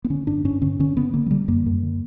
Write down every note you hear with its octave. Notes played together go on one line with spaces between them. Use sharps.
B3
D3 C#4
G2 D4
G2 C#4
D3 C#4
D3 C#4
D3 B3
D3 A#3
F#3
D3 G3
F#2 A#3
F#2
D3